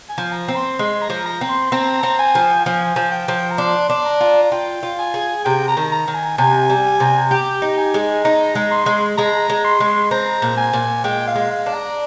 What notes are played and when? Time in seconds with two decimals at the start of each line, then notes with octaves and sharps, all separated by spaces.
0.09 G#5
0.18 F3
0.32 A#5
0.48 C4
0.56 C6
0.79 G#3 C6
1.02 A#5
1.10 F3
1.26 A#5
1.41 C4
1.49 C6
1.72 C4 A#5
2.03 C4
2.19 G#5
2.35 F3
2.65 F3 G#5
2.96 F3
3.12 G5
3.28 F3
3.51 A#5
3.58 D4 C6
3.90 D4
4.05 A#5
4.21 F4
4.52 F4 G5
4.83 F4
4.99 G#5
5.14 G#4
5.45 C3 G5
5.68 A#5
5.77 D#3
5.92 A#5
6.08 D#3
6.15 G#5
6.38 C3 G#5
6.70 G3
7.00 C3
7.31 G4 G5
7.62 D#4
7.78 G#5
7.94 G#3
8.25 D#4 A#5
8.55 G#3
8.71 C6
8.86 G#3
9.18 G#3 A#5
9.49 G#3
9.65 C6
9.80 G#3
10.11 C4 A#5
10.42 A#2
10.58 G#5
10.73 A#2
11.04 G#3 G5
11.27 F5
11.35 G#3
11.51 F5
11.66 D4
11.74 A#5